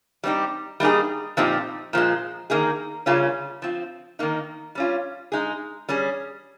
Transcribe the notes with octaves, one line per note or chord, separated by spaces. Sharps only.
G3 C4 D#4 G4
G3 A#3 D#4 G#4
A#2 F3 C4 D#4 G4
A#2 F3 G#3
D#3 A#3 D#4 G#4
C#3 G3 A#3 C#4 F4
F3 C4 F4
D#3 A#3 D#4
G3 C#4 F4
G#3 D#4 G#4
G3 C#4 G#4